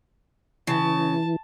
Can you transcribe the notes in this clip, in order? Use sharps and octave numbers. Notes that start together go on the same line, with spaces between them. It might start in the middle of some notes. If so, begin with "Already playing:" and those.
C#3 E3 A5